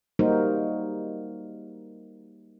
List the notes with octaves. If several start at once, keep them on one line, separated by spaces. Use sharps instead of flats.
G3 A#3 D#4 F#4 A#4 C5